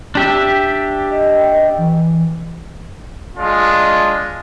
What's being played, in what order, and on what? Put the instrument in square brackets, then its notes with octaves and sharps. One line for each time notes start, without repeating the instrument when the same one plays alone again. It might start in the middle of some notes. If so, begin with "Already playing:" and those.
[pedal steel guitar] D4 G4 E5
[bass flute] D#5
E3
[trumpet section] G#3 D4 F4